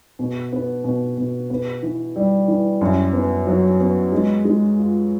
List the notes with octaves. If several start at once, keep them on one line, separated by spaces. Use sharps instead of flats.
B2
B3
B2
B2
B3
E3
G3
E3
F#2
B3
F#3
B3
G#3
G#3
F4